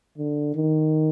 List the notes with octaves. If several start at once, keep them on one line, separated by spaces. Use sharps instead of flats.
D3
D#3